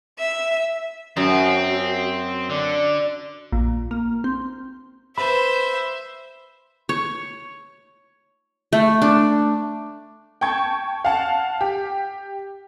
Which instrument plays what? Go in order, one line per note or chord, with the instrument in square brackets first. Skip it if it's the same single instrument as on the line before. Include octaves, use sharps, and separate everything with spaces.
[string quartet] E5
[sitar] F#2 [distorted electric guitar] C4 [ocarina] F#4
[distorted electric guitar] D3 [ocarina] D5
[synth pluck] A#1
A#3
C4
[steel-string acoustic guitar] B4 [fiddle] C5 [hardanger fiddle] E5 [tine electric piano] B5
[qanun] C#5
A3
D4
[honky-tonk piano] G5 A5 C#6 G#6
F5 F#5 A5
G4